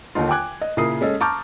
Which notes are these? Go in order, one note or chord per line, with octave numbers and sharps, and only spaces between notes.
D#2 D3 D#4 F4
G5 G#5 D6 F#6 G#6
D#5
A#2 C#3 E4 A#4 D#6 C7
G#3 C#4 A4 D#5
A5 A#5 C#6 D6 F6 G6